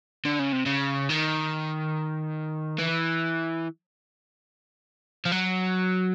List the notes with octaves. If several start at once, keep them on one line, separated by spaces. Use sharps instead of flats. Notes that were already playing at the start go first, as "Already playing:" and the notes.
D3
C#3
C3
C#3
D#3
E3
F3
F#3